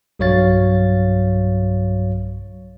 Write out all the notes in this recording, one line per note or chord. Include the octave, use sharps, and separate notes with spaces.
B1 G2 F#3 C#5 F5 A6